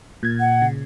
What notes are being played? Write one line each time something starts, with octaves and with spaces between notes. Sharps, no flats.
A#2 G#6
F#5
C#3